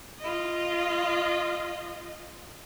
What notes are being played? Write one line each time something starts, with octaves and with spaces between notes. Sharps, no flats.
F4 D#5